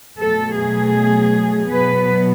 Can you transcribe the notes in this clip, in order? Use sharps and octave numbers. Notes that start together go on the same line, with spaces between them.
B2 F#3 A3 A4
G#4
B2 F#3 B3 B4